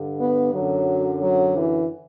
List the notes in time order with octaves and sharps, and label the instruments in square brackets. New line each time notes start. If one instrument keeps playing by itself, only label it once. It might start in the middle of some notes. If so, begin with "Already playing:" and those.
Already playing: [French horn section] G2 D3
B3
F#2 D3 F#3
F#3
E3